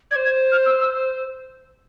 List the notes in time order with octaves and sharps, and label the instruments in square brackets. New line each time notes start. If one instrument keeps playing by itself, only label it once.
[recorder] D5 [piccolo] G#6
[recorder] C5
[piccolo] G#6
F6
E6
E6